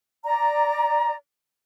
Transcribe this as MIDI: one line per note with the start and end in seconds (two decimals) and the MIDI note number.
0.25 1.15 74
0.25 1.15 82